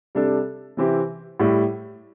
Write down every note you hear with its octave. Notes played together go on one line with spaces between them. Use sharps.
C3 G3 D4 A4
C3 E3 C4 G4
A2 G3 E4